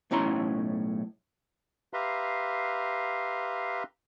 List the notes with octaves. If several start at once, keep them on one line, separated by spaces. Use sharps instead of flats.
B1 A2 C#4 E4 A#5 C6
G4 B4 E5 F5 A#5 C6